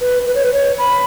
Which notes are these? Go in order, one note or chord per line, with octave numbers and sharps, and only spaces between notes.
B4
B4
C#5
B4
C#5
B5